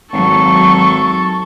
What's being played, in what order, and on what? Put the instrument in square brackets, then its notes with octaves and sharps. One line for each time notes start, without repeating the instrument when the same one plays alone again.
[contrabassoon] G#1 [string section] F#3 [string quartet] A4 [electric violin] C#6